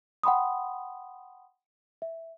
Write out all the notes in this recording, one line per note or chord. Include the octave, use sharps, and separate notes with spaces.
F#5 G5 B5 C6 D#6
E5